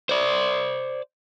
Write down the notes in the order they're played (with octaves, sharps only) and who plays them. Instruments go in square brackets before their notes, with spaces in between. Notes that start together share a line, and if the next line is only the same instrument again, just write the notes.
[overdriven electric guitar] C5 D5